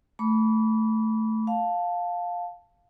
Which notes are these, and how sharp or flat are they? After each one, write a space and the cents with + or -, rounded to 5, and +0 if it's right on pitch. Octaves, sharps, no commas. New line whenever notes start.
A3 +0 B5 -15 D6 -40
F5 +15 A5 +0